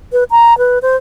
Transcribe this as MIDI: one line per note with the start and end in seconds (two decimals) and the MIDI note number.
0.12 0.24 71
0.31 0.57 82
0.58 0.78 71
0.82 0.96 72